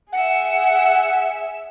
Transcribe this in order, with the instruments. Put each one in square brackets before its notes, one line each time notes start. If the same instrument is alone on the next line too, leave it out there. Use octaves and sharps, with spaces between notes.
[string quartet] G#4 E5 [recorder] F#5